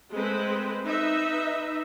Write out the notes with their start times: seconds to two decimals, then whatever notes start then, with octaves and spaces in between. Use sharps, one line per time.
0.13 G#3 A3 C4 B4
0.86 D#4 B4 E5